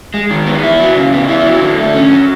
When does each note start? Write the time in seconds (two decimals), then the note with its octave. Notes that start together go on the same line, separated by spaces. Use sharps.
0.14 G#3
0.30 D#3
0.47 B3
0.63 E4
0.80 F#3
0.96 C#3
1.12 B3
1.29 E4
1.45 F#3
1.61 D3
1.77 A3
1.94 C#4
2.10 F#3